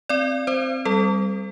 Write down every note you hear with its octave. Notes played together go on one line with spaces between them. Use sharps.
C4 D5
C4 C5
G3 A4